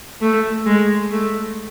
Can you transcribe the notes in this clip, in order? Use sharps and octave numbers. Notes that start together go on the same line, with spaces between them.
A3
G#3
A3